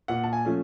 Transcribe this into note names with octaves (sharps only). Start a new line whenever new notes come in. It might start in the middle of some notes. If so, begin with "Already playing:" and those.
A#2 F#5
A5
G#5
F3 A3 C#4